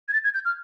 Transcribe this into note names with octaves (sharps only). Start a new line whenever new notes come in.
G#6
A6
G#6
G6
F6